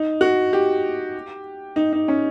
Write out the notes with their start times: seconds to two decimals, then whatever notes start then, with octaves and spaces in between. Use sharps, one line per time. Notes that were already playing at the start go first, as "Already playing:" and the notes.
Already playing: D#4
0.21 F#4
0.53 G4
1.76 D#4
1.93 D#4
2.08 C#4